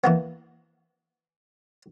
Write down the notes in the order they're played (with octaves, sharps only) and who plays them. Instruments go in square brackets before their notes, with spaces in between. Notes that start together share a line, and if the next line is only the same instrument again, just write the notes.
[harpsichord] E3 A#3 B3